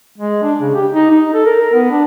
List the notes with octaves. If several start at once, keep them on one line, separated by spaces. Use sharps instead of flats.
G#3
D4
C#3
G4
D#4
D#4
A4
A#4
A#4
B3
D4